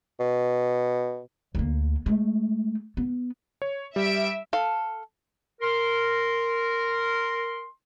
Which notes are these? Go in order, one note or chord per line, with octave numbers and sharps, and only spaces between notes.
B2
D2 A#3
G#3 A3
B3
C#5
G3 E5 D7
A4 F5
A#4 C6